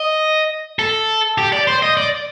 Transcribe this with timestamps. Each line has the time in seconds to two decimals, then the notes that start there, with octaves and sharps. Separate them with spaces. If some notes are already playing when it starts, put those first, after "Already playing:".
Already playing: D#5
0.79 A4
1.38 G4
1.53 D5
1.67 C5
1.82 D#5
1.97 D5